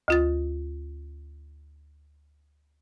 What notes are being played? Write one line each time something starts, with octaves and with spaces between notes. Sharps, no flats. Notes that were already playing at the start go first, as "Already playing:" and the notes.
D2 F4 A6